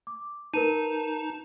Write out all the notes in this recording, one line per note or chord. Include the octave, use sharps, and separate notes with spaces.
D6
D#4 A#4 B4 A5 D#7